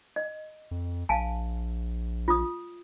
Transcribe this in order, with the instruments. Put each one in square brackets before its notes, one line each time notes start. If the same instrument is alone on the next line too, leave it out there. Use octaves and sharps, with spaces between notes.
[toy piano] D#5
[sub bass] F2
[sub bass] A#1 [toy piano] F5 G#5 A5
[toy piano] F4 D#6